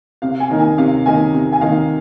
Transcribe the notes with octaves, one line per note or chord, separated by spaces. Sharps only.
C3 F5
G#5
D#3 A#3 D#4
G#5
C3 F5
D#3 A#3 D#4 G#5
C3
G#5
D#3 A#3 D#4 F5